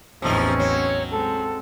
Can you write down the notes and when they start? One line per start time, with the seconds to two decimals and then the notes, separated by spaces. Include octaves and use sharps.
0.22 A1 E2 C3 F3 C4 C#4 D#4
0.60 F#3 C#5
1.11 G#3 C4 A4